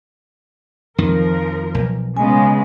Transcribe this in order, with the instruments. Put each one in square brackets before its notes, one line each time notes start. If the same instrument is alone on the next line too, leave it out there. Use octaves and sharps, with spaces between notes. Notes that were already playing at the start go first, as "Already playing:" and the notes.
[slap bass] F2 D#3 [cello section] F3 A#4
[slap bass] B1
[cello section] C#3 G#3 B3 [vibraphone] G#5